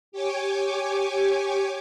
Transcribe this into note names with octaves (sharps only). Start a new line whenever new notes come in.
G4 C#5 G#5 D6